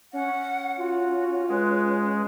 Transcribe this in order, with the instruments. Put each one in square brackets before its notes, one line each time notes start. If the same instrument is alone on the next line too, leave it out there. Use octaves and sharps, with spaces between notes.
[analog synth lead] C#4 [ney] F#5
[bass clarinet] F4 [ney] F#4
[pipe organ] G#3 [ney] B4